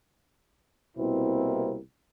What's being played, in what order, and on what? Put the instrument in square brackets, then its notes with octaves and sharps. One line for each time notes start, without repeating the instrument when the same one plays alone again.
[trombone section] C2 B2 A#3 C4 E4